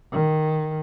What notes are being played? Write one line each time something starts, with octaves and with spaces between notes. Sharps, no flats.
D#3